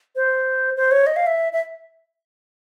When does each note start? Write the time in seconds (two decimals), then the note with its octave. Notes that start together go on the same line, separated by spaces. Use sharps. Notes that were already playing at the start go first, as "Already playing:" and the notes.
0.16 C5
0.77 C5
0.91 C#5
1.07 D#5
1.16 F5
1.27 E5
1.53 E5